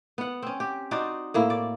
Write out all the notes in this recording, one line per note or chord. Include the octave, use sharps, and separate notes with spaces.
B3 F#5
C4 C#4
G4
D#4 F#4 C5 D5
A2 A#3 E4
D5